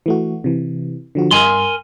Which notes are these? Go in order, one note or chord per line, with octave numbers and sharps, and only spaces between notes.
E3 A3 F#4
C3 E3
D3 F3 F#4
G2 A#4 G#5 C6